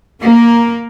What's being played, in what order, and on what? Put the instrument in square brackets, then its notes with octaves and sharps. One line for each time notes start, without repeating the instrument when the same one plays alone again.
[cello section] A#3